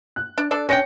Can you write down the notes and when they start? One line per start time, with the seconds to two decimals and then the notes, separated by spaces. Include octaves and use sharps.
0.16 F#6
0.38 D4
0.51 D4 A4 D5
0.69 C#4 D4 C#5 G5 A#6 C#7